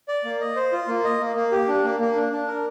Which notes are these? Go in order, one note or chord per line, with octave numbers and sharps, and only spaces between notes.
D5
A#3
D#5
C5
F4
A#3
D#5
A#3
A#3
G4
D4
A#3
A#3
D4
D4
A#4